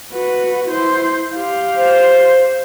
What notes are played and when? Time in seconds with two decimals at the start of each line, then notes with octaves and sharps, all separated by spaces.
0.12 F#4 B4
0.69 E4 C5
1.36 G4 F5
1.76 C5